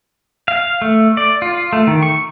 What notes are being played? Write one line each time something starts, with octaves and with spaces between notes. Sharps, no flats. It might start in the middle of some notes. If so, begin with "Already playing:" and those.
F5
A3
D5
F4
A3
D#3
C#6